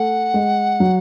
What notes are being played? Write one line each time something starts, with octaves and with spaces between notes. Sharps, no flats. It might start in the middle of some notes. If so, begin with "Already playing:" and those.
Already playing: A3 F#5
G#3
F#3